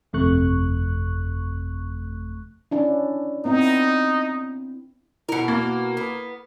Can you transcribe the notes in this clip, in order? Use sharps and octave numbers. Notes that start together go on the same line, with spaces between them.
G1 F2 C3 A3 C#6 F#6
C#4 D4 E4
B3 C4 D#4 E4
B2 E4 A#4 C#7
A#3
B3